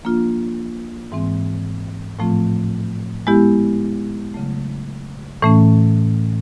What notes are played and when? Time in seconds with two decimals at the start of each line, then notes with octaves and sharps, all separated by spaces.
0.03 F3 A#3 D4 F4
1.12 G#2 E3 G#3 C4
2.19 A2 F3 A3 C4 F4
3.27 G#3 B3 E4 G4
4.34 C#3 F#3 A3
5.42 A2 E3 A3 C#4